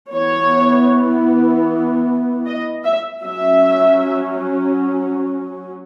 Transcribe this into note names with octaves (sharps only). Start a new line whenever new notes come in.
E3 B3 C#5
D#5
E5
F#3 C#4 E5